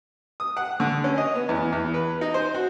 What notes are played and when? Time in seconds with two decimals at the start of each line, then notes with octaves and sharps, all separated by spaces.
0.40 D#6
0.57 F#5
0.80 D3
1.04 C#4
1.18 D#5
1.35 B3
1.49 E2
1.72 E2
1.94 B4
2.21 D#4
2.34 C5
2.55 F#4